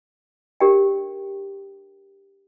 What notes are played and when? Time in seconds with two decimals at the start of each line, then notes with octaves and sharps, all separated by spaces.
0.60 D4 G4 A#4 D5 G5